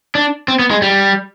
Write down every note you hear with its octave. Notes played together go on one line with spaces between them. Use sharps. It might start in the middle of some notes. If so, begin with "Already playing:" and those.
D4
C4
B3
G#3
G3